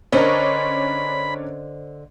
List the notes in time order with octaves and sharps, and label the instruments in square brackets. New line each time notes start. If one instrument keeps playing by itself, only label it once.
[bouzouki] D3 C5 D#5 [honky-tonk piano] C#4 D4 A#4 [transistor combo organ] B5